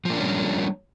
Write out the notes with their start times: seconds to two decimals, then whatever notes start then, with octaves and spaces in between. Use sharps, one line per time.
0.05 F3
0.09 A#3
0.13 D4
0.17 C#4
0.21 G3